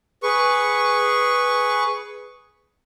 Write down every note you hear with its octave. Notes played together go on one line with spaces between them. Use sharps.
G#4 B4 C#6